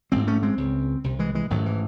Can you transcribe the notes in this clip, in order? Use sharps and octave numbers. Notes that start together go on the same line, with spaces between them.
A1 G#2 G#3 C4
A3 C#4
G#3 C4
C#2 C#3
C2 C3
E3 G#3
E3 G#3
A1 G#2 D#3 F#3
E3